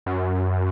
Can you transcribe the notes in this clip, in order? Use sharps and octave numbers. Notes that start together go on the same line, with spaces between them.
F#2